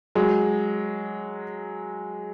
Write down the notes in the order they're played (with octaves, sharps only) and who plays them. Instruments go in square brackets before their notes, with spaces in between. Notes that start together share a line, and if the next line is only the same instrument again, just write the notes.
[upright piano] F#3 G#3